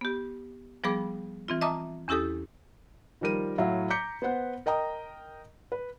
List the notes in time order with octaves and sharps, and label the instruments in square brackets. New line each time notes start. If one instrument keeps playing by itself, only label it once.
[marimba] B3 G4
F3 G3 B3 G#4 B5 D6
E3 C4 F4
D#5 E5 A5 A#5 D6 D#6
E2 C#4 E4 G4 A4 D#6
[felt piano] D#3 F3 G3 A#4 D#7
A2 F#3 E5 F5
A#5 D6 G6 B6 C#7
B3 C5 F#5 G6
A#4 D#5 G5 A#5 D#6
B4